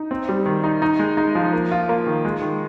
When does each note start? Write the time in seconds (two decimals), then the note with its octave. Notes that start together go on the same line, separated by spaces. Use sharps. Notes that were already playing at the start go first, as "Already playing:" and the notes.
Already playing: D#4
0.11 C4
0.29 G3
0.46 D#3
0.64 D#4
0.82 D#4
0.99 G#3
1.17 D#4
1.35 F3
1.53 A#3
1.71 F4
1.89 A#3
2.07 D#3
2.25 G#3
2.42 D#3